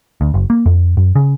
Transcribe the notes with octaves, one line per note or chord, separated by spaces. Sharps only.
D2
F#1
A#3
F2
F#2
C#3